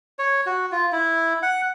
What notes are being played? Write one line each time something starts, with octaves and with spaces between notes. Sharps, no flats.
C#5
F#4
F4
E4
F#5